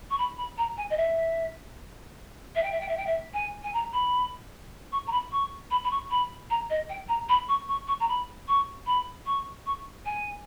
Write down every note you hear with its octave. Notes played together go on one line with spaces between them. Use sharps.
C#6
B5
B5
A#5
G#5
D#5
E5
E5
G5
E5
G5
E5
G5
E5
G#5
G#5
A#5
B5
C#6
A#5
B5
C#6
B5
B5
C#6
B5
A#5
D#5
G5
A#5
B5
C#6
C#6
C#6
A#5
B5
C#6
B5
C#6
C#6
G#5